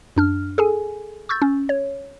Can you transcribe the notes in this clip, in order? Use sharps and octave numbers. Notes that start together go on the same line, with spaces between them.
F#2 D4 F6
G#4 A4 G#5
C#6 E6 G6 A6
C#4
C#5